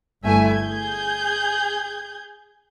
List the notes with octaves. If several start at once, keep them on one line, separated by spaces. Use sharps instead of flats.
G1 G2 A3 E4 E5 G#5
G#4 G6 G#6